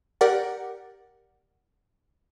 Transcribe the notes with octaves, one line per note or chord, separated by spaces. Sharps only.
G4 A#4 D5 F#5